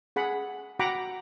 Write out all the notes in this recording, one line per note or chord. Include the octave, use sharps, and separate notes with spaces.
G#4 F#5 B5
F#4 F#5 G5 A#5 B5 D6